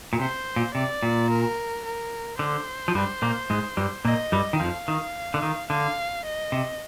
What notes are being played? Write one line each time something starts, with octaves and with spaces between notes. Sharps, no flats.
A#2
C3 C5
A#2
C3 D5
A#2
A#4
A#4
D3 C5
F3
G2 G3
A#2 A#3
G#2 G#3
G2 G3
A#2 A#3 D#5
G2 G3
D#3
F2 F3 F5
D#3
D3
D#3
D3 F5
D#5
C3